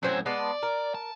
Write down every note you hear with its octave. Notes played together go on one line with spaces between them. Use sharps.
F#2 A2 F#3 C4 G#5
G#3 B3 D5 A5
A#4
A5